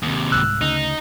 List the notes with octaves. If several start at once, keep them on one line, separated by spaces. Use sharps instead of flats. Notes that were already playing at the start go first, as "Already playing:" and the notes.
D#2 C3
C2 G#2 E6 F#6
D2 C#3 D#4